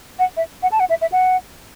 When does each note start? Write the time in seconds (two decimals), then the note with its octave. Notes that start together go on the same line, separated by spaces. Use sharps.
0.19 F#5
0.37 E5
0.62 F#5
0.72 A5
0.80 F#5
0.89 E5
1.01 E5
1.12 F#5